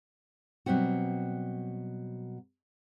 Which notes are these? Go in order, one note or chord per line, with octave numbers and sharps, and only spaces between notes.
B2 F#3 G3 C4 F#4